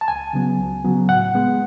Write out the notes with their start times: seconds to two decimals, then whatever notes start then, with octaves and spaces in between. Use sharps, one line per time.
0.01 A5
0.08 C#2 G#5
0.33 C#3 F#3 B3
0.58 C#2
0.84 C#3 F#3 B3
1.09 A2 F#5
1.35 G#3 B3